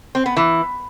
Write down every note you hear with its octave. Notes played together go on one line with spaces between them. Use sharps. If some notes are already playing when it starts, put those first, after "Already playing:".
C4
B3
E3